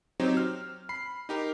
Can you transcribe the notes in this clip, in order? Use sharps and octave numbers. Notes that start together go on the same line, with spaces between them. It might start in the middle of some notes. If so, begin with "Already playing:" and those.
F#3 C4 D#4 G4 C5
F6
B5 C7
D#4 G4 A#4